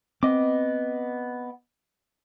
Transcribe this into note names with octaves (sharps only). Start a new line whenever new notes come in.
B3 C4 D#5 D6